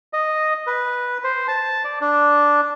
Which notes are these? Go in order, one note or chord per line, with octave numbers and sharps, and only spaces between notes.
D#5
B4
C5
A5
D5
D4